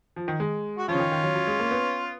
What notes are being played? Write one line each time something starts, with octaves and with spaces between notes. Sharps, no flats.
F3
D#3
G#3
F#4
F3 C#4 F4
C#3
D#3
D#3
F#3
F#3
G#3
A#3
B3